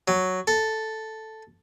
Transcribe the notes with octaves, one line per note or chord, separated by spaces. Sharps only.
F#3
A4